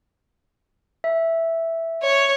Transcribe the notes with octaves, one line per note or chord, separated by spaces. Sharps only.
E5
C#5